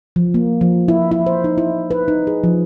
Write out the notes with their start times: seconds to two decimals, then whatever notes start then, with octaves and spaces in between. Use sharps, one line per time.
0.16 F3
0.34 A#3
0.61 F3
0.88 E4
1.11 E4
1.26 C5
1.44 D#4
1.58 E4
1.91 B4
2.08 D#4
2.27 G#4
2.44 F3